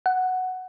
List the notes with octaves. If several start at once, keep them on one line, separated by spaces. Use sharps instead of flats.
F#5